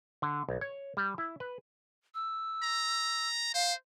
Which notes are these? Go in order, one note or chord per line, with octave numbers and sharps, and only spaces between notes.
D3
B1
C#5
G3
E4
B4
E6
A#5
C5 F5